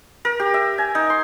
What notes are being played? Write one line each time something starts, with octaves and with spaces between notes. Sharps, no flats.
A#4
G4
E5
G#5
D#4
C6